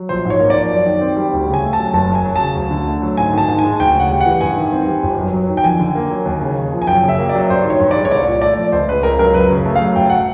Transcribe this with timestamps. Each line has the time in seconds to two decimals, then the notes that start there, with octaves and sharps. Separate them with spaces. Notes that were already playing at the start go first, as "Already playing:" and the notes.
Already playing: F#3
0.09 A#1 C5
0.25 G#2
0.30 C#5
0.40 A#3
0.50 D5
0.56 F3
0.71 F#2
0.86 D#3
1.01 C4
1.17 G3
1.33 D2
1.48 C#3
1.54 G#5
1.63 A3
1.73 A5
1.79 F#3
1.94 F#1 A5
2.09 F#2
2.15 G#5
2.25 F#3
2.36 C#3 A5
2.55 D2
2.71 D3
2.87 A3
3.02 F#3
3.17 G#2 G#5
3.33 D#3 A5
3.48 G#2
3.59 G#5
3.65 G#3
3.80 D2 G5
3.95 C#3
4.00 F#5
4.10 G3
4.21 F#5
4.26 E3
4.41 G2 G#5
4.57 D#3
4.72 C4
4.87 G3
5.03 G1
5.19 F#2
5.33 F#3
5.49 D#3
5.57 G5
5.64 F2 G#5
5.79 D3
5.95 A#3
6.10 F#3
6.26 D#2
6.41 C#3
6.57 D#2
6.72 F3
6.82 G#5
6.87 F#2 G5
7.04 C#3 E5
7.18 A#3
7.29 D5
7.35 F#3
7.50 G2 C5
7.65 D#3 C#5
7.80 G2
7.91 D5
7.96 G#3
8.05 C#5
8.11 C2 D5
8.26 A#2
8.41 A3 D5
8.57 F3
8.72 C#2 C5
8.88 C#3 B4
9.03 C#2 A#4
9.19 F#3 A#4
9.34 F#2 B4
9.50 C#3
9.65 A3
9.76 F5
9.81 F#3
9.96 G1 G5
10.10 F#5